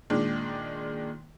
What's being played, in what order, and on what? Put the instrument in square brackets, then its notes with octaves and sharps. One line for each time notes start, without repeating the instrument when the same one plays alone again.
[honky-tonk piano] A#2 D#3 G#3 D4